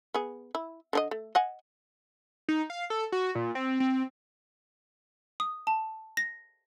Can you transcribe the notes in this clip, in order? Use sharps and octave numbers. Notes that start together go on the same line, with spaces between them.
B3 G#4
E4
D3 D4 D#5
A3
D#5 F#5 G#5
D#4
F5
A4
F#4
A#2
C4
C4
D#6
A5
A#6